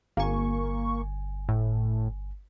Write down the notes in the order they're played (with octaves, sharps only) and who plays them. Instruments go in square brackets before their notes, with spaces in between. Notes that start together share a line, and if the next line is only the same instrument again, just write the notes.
[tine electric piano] G1 G#5 [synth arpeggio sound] A#3 C#6
[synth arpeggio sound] A2